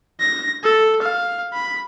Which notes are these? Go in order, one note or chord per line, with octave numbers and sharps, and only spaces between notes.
A#6
A4
F5
B5